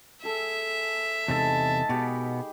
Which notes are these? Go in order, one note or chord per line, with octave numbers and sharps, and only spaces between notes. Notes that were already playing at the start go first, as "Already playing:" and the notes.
G#4 A4 E5 G#5
E2 C3 G#3 D#4 A4 F5 A5
B2 B3 G4 G#4 B5